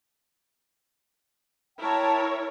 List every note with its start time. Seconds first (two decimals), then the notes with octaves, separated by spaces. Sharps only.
1.79 E4 A#4 C#5 G5 A5